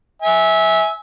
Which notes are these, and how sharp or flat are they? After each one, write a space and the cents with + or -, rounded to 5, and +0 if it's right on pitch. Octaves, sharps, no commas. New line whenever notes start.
E5 -20 G#5 +0